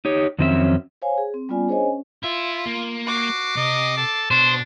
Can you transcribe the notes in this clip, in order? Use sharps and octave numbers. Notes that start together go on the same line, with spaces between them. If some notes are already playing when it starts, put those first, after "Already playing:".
D#4 G4 C#5
F2 D#3 F#3 C4 C#4 E5
C5 C#5 F5 G#5
G#4
C4
G3 B3 C#4 F4 D5 G#5
D4 G#4 C5 C#5 D#5 G#5
C#4
E4 F4
A#3
F#4 D6 C7
C3 D#5
A4
B2 D4 C5